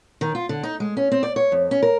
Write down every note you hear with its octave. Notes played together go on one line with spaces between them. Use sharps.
D#3
F4
D3
D#4
G#3
C#4
C4
D5
C#5
F2
C#4
A#4